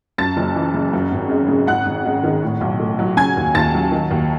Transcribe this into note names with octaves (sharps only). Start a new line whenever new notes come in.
F#2 A5 A6
F#1
E3
C#3
F#2
G#1
G#3
C#3
G#2 F#5 F#6
G#1
G#3
D#3
A2
B1
A3
F#3
C#3 G#5 G#6
D#2
D#2 A5 A6
F#3
D#3
D#2